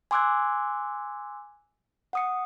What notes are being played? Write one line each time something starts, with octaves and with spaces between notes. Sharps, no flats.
G#5 C6 D6 E6 F#6 G#6
F#5 D#6 C#7